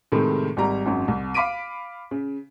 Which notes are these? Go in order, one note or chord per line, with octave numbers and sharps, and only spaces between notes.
A2 C3 D#3 G#3
G#1 G3 A#5
G#1 F#2 F#3
C2
F5 B5 D6 B6 D7 D#7
C#3